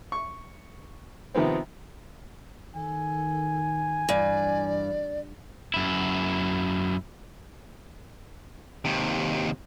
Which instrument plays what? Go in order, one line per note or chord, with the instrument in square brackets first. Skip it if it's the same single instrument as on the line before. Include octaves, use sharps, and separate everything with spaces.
[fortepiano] C#6
C3 D#3 F3 B3 C4
[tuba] D#3 [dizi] A4 [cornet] G#5
[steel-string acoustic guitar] G2 [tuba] E3 [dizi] D5
[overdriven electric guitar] F#2 E4
[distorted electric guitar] D#2 C3